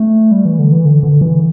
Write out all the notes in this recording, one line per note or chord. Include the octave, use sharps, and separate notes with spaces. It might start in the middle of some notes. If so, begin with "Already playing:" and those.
Already playing: A3
G3
E3
D3
E3
D3
D3
E3